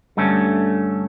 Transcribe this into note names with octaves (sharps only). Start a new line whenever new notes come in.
G2 D3 A3 C#4